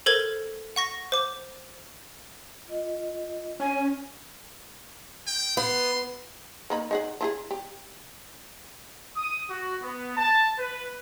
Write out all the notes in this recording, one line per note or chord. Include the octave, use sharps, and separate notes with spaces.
A4 A#4 C5 G#6
F#5 C#6 A#6
C5 D6
F4 D#5
C#4 G#5
G5
B3 C6
A#3 D#4 B5
D#4 G#4 F#5
F3 E4 G#4
G4
D#6
F#4
B3
A5
B4